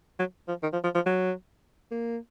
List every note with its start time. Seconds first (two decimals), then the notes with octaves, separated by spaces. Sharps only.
0.19 F#3
0.48 F3
0.63 D#3
0.73 F3
0.84 F3
0.95 F3
1.06 F#3
1.91 A#3